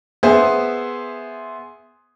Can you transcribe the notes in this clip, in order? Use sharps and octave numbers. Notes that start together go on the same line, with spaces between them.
B3 G#4 C5 E5